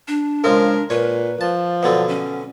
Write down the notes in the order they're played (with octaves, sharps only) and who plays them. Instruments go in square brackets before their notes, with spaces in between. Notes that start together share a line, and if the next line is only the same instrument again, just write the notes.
[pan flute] D4
[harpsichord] C#3 F3 G#3 [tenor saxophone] A#4
[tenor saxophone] A#2 [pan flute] B4 [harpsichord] C#5
[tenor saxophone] F3 [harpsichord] A5
[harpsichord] B2 D3 F#3 [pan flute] D5
[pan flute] C#4